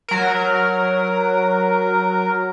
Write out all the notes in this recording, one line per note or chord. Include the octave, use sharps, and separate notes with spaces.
F#3 A#4